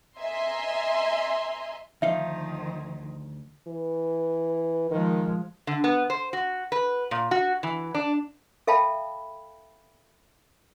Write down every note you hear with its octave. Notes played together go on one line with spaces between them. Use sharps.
D#5 E5 G#5 A#5 C6
D2 D#3 F3 D#4 E5 F5
E3
D#3 F3 G#3
D3
B3
C5
F#4
B4
A#2
F#4
E3
D4
A4 E5 F5 G5 A5 B5